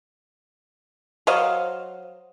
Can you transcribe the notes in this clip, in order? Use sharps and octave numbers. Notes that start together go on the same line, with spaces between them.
F#3 C5 D#5 F5